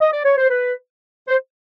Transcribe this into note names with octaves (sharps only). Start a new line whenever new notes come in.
D#5
D5
C#5
C5
B4
C5